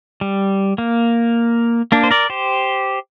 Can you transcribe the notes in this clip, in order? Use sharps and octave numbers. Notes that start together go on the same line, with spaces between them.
G3
A#3
A#3 D4
C5
A#4 D5
G4 C5